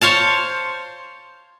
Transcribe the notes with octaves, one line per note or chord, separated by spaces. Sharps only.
C5 C#5 F5 A5